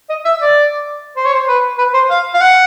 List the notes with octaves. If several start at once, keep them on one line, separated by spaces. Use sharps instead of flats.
D#5
E5
D5
C5
C#5
C5
B4
B4
C5
F5
F5
F#5